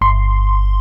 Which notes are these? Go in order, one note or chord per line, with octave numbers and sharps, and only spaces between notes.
G1 C6